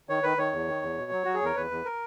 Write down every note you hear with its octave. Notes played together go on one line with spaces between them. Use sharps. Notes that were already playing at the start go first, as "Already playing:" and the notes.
D#3 C#5
D#3 B4
D#3 C#5
E2
D#3
E2
B2
F#3
F#3 F#4
G#4
E2 A#4
E2 B4
E2
A#4